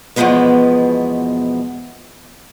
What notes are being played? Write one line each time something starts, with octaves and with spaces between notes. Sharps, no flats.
E2 B2 D#3 F3 G#3 B3